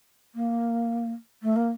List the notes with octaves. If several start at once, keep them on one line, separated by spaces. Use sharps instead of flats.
A#3
A3
A#3